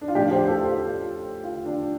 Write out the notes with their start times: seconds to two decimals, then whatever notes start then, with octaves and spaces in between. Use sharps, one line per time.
0.01 D4
0.08 F4
0.15 A2 F3 D4 G4
0.31 G4 C5
0.47 F4 A4
0.63 F4
1.44 F4
1.65 D4